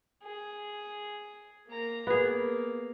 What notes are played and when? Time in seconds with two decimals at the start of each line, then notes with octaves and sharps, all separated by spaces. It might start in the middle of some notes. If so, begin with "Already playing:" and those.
0.23 G#4
1.67 A#3 A#5
2.07 A#3 B3 G#4